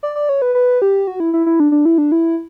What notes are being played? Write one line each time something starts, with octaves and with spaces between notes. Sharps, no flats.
D5
D5
C#5
B4
B4
G4
F#4
E4
E4
E4
D4
D4
E4
D4
E4